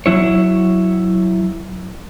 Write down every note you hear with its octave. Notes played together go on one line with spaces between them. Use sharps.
F#3 E4 C#5